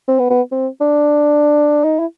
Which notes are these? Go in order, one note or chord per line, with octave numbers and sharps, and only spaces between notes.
C4
B3
B3
C4
D4
D#4
E4